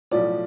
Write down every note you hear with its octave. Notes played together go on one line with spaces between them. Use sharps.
B1 A2 F3 D5